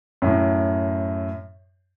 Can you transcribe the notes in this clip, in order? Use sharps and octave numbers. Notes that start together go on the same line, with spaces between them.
F#2 A2